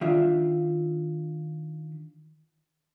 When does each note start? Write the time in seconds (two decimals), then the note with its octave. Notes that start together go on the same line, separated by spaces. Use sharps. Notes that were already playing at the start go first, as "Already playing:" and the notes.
0.01 D#3 D4 F4 E5